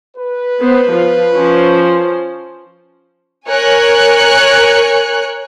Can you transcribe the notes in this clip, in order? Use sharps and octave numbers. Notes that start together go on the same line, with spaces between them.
B4
B3 C5
F3 F4
F3 C#4 C5
A#4 C#5 G#5 F#6 C#7